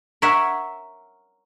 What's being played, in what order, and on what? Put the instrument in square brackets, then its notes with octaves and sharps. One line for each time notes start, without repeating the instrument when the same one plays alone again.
[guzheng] A#4 C#5 E5 F#5